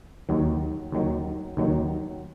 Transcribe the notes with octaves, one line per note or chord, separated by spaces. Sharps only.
D#2 D#3 F#3
D#2 D#3 F#3
D#2 D#3 F#3